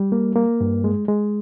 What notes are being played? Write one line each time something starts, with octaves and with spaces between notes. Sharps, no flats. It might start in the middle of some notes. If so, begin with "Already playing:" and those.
Already playing: G3
A#3
A#3
G2
G#3
G#3